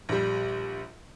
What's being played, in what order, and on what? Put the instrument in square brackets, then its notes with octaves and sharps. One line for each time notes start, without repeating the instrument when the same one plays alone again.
[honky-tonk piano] A#1 G3